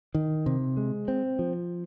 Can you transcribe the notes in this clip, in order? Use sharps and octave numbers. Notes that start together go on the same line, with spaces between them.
D#3
C3
G#3
C4
F3